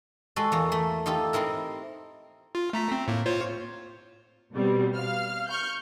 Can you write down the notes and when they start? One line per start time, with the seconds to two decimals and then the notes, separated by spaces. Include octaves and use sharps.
0.36 G#3 F#4 A4
0.52 E2 A#3
0.72 A3
1.06 D#4 F4 G4 A4
1.33 C4 D#4 E4 A#4
2.55 F4
2.73 A3 A#5 B6
2.92 C4
3.08 A2 A#3
3.26 F4 C5 C#5
4.53 B2 G3 C4
4.94 F5 F6
5.48 C#6 F6 G6